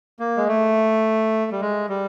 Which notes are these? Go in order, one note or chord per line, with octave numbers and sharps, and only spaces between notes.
A#3
G#3
A3
G3
G#3
G3